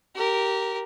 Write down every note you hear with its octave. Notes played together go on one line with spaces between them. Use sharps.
G4 A#4